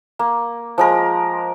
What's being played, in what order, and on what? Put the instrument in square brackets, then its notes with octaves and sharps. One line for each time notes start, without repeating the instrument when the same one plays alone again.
[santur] A#3
F3 G#3 A#4